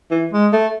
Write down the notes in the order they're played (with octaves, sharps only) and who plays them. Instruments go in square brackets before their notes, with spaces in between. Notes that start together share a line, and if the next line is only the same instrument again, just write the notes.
[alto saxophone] E3
G#3
A3